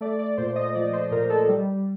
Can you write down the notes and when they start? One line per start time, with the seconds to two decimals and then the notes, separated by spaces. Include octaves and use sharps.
0.01 A3 D5
0.19 D5
0.37 A#2 C5
0.56 D#5
0.75 F3 D5
0.93 C5
1.11 A#2 A#4
1.30 A4
1.48 G3